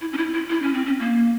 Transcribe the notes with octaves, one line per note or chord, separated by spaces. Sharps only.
E4
C#4
E4
E4
E4
C#4
C4
C#4
A#3